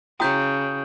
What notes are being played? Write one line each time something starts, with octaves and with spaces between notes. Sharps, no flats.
C#3 E4 F#4 G5 D#6 G6